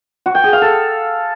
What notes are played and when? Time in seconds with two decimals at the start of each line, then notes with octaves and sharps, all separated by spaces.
0.26 F#4
0.35 G5
0.44 G#4
0.53 F5
0.62 A4